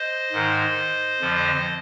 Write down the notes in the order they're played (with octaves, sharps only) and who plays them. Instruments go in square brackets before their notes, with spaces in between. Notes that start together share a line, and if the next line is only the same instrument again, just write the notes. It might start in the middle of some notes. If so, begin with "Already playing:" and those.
Already playing: [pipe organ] C5 D#5
G#2 D#3
F2 D3 F3